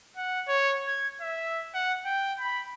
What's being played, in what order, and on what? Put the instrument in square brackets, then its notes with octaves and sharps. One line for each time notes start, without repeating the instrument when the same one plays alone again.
[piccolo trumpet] F#5
C#5
G#6
E5
F#5
G5
B5